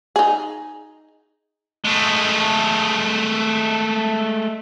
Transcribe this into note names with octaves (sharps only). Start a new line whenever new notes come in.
D#4 G#4
G#3 A3